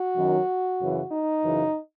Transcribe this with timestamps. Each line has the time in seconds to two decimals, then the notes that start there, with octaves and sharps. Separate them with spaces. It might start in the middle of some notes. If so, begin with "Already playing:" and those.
Already playing: F#4
0.15 F#2 D#3
0.79 F#2 C#3 E3
1.10 D#4
1.42 F#2 C#3 E3